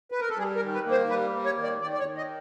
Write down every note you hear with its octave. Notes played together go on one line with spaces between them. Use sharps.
B4
A#4
A4
G3 G#4
A#4
D#3
B4
A#3
C5
G3 B4
A#3
C#5
D#3
D5
D#3 D5
D5
C#5
D#3
D#5